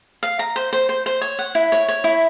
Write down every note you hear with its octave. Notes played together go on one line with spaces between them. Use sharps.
F5
A#5
C5
C5
C5
C5
C#5
F#5
E4
C#5
C#5
E4